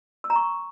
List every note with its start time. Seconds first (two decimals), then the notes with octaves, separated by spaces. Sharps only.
0.24 E6
0.30 A#5
0.36 C#6